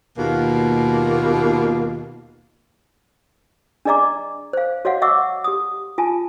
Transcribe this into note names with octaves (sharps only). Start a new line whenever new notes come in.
D#2 B2 A#3 F4
D4 G#4 D5 D#5 A#5 D6
C5 F5
F#4 C#5 D#5 F5 F#5
D#5 E5 F#5 C#6 D6 E6
G4 D#6
F4 G#5 A5